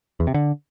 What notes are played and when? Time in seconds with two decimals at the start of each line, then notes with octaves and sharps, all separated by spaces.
0.20 E2
0.27 C3
0.34 D3